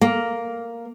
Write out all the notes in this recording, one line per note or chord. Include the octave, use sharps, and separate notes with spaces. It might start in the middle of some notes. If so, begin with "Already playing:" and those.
A#3